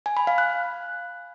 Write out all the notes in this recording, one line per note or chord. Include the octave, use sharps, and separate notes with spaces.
G#5
B5
F5
F#6